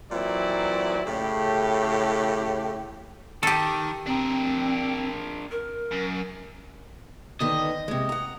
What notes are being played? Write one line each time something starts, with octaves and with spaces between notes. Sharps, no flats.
A#2 E3 F#3 C4 E4 D5
A2 C#3 G4
D#3 G4 A4
C4 D4 A#4
A#4
F#2
D3 D#3 B3 D#5
C3 G#3
F#5 A#5